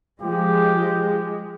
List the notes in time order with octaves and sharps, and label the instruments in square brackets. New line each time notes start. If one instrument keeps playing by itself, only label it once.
[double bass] F3 [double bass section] G#3 [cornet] G4